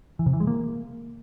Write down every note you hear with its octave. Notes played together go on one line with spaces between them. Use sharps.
E3
C3
E3
G#3
A#3